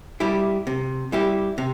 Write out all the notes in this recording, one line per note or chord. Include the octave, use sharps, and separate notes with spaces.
G3 E4 G4
C3
G3 E4 G4
C3